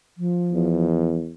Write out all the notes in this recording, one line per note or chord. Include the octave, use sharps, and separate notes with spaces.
F3
E2